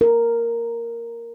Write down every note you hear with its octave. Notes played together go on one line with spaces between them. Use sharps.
A#4